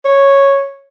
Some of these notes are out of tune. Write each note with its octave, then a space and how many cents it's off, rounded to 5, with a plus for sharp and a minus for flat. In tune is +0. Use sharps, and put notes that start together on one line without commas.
C#5 -5